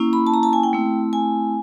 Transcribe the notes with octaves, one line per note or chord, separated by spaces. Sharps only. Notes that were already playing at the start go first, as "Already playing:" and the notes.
Already playing: A#3 C#4 E4
B5
A5
A#5
A5
G#5
G5
A3 C4 E4
G#5